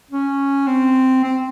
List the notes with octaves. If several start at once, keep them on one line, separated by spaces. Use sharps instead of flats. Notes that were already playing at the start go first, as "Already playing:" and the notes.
C#4
C4
C4